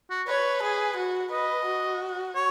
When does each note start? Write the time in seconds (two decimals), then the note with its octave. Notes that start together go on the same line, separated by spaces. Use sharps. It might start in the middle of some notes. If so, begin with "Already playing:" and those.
0.10 F#4
0.28 B4 C#5
0.63 G#4
0.97 F#4
1.31 B4 D#5
1.65 F#4
2.35 C#5